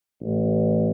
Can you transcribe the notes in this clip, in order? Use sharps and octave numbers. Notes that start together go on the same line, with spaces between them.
A1